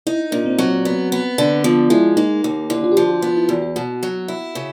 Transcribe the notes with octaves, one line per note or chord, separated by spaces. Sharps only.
D#4 E4
A#2 D4
C4
F#3 C4
B3
B3
D3
F3 B3
G#3 E4
A#3 D#4
D#2
D3 E4
F4
G4
F3 F#4
F#4
B3 F4
E4
E2 F#4
F#4
B2 F#4
F#3
E4
C#3